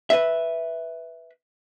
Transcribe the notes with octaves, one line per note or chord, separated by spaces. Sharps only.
B4 E5